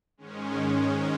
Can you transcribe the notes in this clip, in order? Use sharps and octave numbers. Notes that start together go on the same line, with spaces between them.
G#2 D#3 G#3 C#4